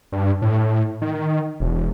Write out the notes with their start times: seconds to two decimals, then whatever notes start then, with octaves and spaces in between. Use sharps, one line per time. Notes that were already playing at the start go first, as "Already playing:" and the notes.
0.12 G2
0.42 A2
1.01 D#3
1.60 E1